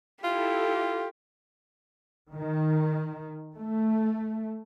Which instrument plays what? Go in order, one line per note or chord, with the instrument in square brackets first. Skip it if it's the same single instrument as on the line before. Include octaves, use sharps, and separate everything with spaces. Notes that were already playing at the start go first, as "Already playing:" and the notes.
[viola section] E4 A4 [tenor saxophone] F4 [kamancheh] G4
[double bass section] D#3
A3